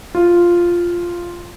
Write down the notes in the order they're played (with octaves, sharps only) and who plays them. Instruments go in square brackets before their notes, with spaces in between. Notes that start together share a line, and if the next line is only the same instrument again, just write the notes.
[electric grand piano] F4